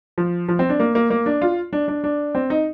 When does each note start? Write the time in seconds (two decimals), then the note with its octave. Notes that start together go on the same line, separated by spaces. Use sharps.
0.18 F3
0.48 F3
0.59 C4
0.69 D4
0.80 A#3
0.95 A#3
1.10 A#3
1.26 D4
1.42 F4
1.73 D4
1.88 D4
2.04 D4
2.35 C4
2.50 D#4